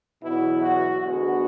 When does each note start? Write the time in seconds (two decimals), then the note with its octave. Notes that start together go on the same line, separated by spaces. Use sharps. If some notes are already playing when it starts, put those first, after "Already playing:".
0.22 E2 B2 F#3 B3 E4
0.62 F#4
1.01 D2 D3 G#3 B3 F#4